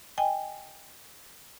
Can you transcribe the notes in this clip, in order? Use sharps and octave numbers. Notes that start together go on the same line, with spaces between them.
D#5 G5 G#5